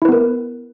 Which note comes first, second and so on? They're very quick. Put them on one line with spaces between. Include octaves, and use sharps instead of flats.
E4 B4 B3 A#4